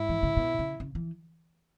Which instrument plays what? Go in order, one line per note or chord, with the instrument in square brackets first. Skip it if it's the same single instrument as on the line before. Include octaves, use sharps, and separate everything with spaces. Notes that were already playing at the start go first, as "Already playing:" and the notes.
Already playing: [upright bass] G#2 [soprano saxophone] E4
[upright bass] E3
C#3
B2
C#3
C#3
E3